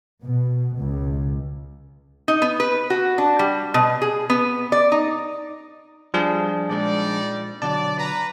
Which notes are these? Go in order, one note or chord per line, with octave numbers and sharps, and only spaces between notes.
B2
C#2
D#4
B3
B4
F#4
D4
G3
B2
G#4
B3
D5
D#4
F3 G3 D4 G#4
A#2 G3 G#3 D#4 D5
B2 D3 F#3 D5 A5
B4 A#5